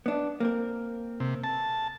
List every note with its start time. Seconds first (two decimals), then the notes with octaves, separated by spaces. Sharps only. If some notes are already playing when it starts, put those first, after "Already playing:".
0.06 B3 D4
0.40 A#3 C4 A#4
1.20 C3
1.44 A5